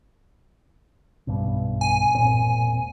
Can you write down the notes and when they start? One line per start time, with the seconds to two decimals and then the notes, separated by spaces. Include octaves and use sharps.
1.27 B1 G2 B2
1.81 G#5
2.14 E1 A#2 C4